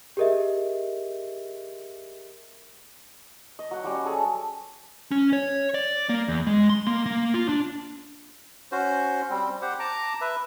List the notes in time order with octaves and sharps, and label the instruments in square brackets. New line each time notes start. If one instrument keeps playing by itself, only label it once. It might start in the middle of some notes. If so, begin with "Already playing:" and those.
[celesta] G4 G#4 A#4 D#5 E5
[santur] D#5
F#3 F#5 G5
F#3 G3 C#4
G#4 A4
[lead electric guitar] C#4
C#5
D5
A#3
E2
G#3
C6
A#3
A#3
F4
D4
[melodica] C#4 F#4 C5
G3 C4
G4 C5 F#5
A5 A#5 D6
B4 E5